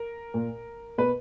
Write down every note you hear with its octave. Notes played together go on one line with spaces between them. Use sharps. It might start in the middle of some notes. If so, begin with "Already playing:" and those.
Already playing: A#4
A#2
B2 B4